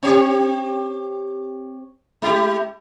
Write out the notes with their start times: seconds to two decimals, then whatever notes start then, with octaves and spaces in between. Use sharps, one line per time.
0.03 C4 G4 C#5
2.22 G#3 E4 G4